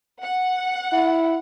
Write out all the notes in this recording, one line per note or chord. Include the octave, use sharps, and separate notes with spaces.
F#5
E4